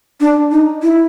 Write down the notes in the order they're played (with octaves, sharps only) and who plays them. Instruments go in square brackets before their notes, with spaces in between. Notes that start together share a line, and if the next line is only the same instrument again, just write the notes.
[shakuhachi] D4
D#4
E4